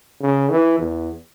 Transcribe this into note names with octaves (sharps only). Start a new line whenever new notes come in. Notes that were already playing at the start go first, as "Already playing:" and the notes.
C#3
E3
E2